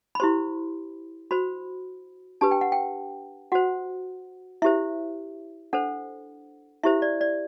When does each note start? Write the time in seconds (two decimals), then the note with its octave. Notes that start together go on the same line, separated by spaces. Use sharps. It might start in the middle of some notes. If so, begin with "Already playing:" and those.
0.15 B5
0.20 E4 G4 C5 C6
1.31 F#4 C5 B5
2.41 D4 G4 B4 A5
2.51 G5
2.61 F#5
2.72 G5
3.52 F#4 C5 F#5
4.62 E4 G4 C5 E5
5.73 D4 A4 C5 F#5
6.83 E4 G4 C5 E5
7.02 D5
7.21 D5